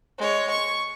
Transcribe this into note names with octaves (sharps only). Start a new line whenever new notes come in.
G#3 C#5
C#6